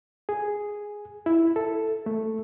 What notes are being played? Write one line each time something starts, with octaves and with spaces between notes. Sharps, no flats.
G#4
E4
A4
A3